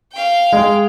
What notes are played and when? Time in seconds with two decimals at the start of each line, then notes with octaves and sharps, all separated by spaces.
0.13 F5 G5
0.53 G#3